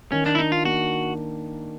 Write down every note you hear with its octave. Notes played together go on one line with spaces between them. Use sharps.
D#3 C#4
D4
E4
D4 D#4
F4
A#3 F#4